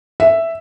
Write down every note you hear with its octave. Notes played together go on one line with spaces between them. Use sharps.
E5